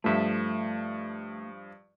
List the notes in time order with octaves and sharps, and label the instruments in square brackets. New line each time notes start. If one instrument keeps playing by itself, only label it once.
[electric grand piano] G2 F3 [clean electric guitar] A3 E5